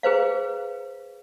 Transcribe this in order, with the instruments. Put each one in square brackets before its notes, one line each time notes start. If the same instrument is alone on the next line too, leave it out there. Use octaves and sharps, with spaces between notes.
[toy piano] G#4 B4 C5 F5